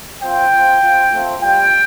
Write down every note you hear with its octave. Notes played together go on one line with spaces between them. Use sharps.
C4 F4 G5
C4 F4
C4 F4
A3 C4 F4
G3 F4 G5